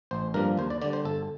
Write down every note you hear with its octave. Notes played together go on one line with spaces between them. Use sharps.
A1 C5
G2 F3 A#3 A#4
D#2 C5
D5
D3 G3 D5
C5
G1 A4